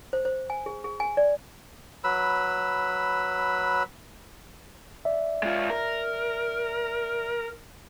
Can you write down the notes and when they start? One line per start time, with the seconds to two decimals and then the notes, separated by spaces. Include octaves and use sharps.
0.13 C5
0.25 C5
0.50 G#5
0.66 G#4
0.84 G#4
1.00 G#5
1.17 D5
2.04 F#3 B4 B5 E6
5.05 D5 E5
5.43 G#3 F4
5.70 A#4